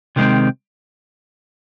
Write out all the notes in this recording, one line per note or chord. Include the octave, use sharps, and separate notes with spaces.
C3 D#3 G#3 C4